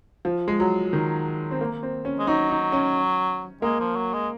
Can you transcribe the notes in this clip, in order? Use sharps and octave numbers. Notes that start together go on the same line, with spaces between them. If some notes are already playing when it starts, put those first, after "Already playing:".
F3
G#3
F#3
D#3
C4
A#3
C4
C#4
G#3
F#3 D#4
D#4
C#4
G#3 A#3
F3
F#3
G#3